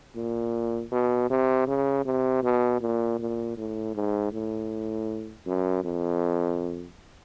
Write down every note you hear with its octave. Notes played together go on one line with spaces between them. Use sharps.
A#2
B2
C3
C#3
C3
B2
A#2
A#2
A2
G#2
A2
F#2
F2